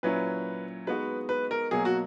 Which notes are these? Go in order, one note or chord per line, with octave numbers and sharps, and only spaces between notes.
A#2 F#3 C#4 E4 B4
G#3 B3 D#4 F#4 B4
B4
A#4
B2 F#3 A#3 G#4
F#4